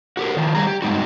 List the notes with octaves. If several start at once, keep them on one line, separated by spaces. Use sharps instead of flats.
F#4 G4 A#4
D#3 F3
G3 G#4 A#5
G4
G2 B2 G#3 D#4 F#4